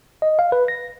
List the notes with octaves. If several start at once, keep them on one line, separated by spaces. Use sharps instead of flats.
D#5
F5
B4
A#6